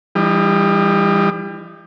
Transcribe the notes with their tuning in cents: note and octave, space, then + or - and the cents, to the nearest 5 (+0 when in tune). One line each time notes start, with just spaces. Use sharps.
E3 +45 G3 +30 D#4 +0